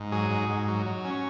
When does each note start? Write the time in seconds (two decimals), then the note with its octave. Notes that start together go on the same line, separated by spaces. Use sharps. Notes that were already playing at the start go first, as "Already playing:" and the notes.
Already playing: G#2
0.12 F#3 G#4
0.30 G#2
0.49 G#2
0.68 F#3
0.86 F#3
1.05 C#4